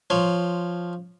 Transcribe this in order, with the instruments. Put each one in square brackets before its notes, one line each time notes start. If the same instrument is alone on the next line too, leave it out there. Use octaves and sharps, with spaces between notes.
[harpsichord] F3 C#5 C6